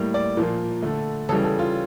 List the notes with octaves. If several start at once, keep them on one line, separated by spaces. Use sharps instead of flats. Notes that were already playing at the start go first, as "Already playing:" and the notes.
Already playing: A2 G3 A#3
D5
A#2 F3 A#3
D3 A3
C#3 E3 G3 A4
A4
F4